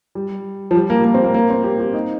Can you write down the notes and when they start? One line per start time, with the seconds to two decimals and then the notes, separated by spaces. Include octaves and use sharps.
0.15 G3
0.71 F3
0.75 G3
0.90 A#3
1.04 A#3
1.14 C4
1.24 A#3
1.34 A#3
1.50 C4
1.64 G4
1.80 G4
1.94 D#4